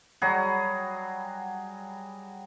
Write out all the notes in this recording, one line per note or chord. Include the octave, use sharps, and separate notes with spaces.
F#3 G3 F#4 G#4